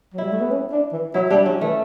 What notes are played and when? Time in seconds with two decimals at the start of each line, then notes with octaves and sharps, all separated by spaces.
0.14 F#3
0.18 E4
0.23 G3
0.32 A3
0.41 B3
0.51 C#4
0.72 D4
0.92 E3
1.14 F#3 E4
1.30 G3 D4
1.46 F#3 C#4
1.61 E3 A3